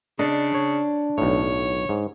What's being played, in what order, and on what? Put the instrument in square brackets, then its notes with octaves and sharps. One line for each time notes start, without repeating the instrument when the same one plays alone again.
[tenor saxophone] C#3 [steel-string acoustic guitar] D4 [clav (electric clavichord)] D#5 A5
[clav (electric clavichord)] C#5
[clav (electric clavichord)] B1 A2 [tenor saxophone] C#5
[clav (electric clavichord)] G#2